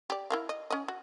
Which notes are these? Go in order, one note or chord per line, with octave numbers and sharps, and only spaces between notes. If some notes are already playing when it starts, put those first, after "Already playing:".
G4 D5
E4 A#4 F5
D#5
C#4 D#5
F#4